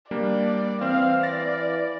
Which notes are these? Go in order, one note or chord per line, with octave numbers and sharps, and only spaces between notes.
G3 A#3 D4 D5
E3 C4 F5
D5 A6 A#6